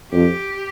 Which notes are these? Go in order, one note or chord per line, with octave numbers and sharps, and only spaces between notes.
F2 G4